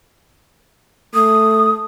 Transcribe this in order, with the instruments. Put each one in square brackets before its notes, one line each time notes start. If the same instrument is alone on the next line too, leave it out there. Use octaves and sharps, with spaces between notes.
[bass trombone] A3 [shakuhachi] D#6